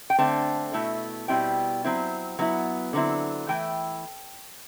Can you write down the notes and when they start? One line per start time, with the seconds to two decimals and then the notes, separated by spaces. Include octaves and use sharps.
0.10 G5
0.19 D3 A3 C4 A5
0.73 B2 A3 E4
1.28 B2 G3 C4 E4 G5
1.84 F#3 C4 E4
2.39 F#3 B3 E4
2.93 D3 F#3 C4 E4
3.48 E3 A3 E4 G5